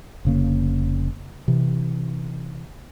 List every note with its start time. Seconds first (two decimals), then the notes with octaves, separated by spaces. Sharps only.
0.25 F1 C#3 A#3
1.48 C3 E3